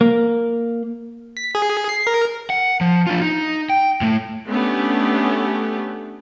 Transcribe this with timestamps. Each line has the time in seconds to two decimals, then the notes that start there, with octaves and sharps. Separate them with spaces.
0.01 A#3
1.37 B6
1.55 G#4
1.89 C7
2.07 A#4
2.50 F#5
2.81 F3
3.07 D4 F4
3.22 D#4
3.70 G5
4.01 A2 A3
4.48 A3 B3 C#4 D4 G4